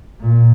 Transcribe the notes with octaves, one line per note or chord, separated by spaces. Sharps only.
A#2